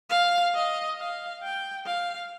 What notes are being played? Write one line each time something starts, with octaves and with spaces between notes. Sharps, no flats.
F5
D#5
F5
G5
F5